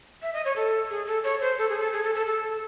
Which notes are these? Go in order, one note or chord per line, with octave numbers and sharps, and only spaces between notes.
E5
D#5
C#5
A4
G#4
A4
C#5
C5
A4
G#4
A4
G#4
A4
A4
A4